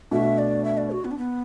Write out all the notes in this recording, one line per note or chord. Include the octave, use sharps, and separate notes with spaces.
B2 A3 D4 F#4 E5
D5
E5
D5
F#4
B3
D4
B3